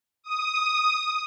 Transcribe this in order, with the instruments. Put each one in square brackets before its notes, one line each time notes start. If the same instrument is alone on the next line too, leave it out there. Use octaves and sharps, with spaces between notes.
[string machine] D#6